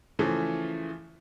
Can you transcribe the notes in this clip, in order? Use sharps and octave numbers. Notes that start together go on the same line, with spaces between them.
C#3 E3 F3 A3